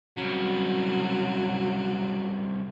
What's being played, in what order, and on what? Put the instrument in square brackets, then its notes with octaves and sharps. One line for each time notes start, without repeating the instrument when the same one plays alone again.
[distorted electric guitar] C2 C#3 [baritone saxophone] F#3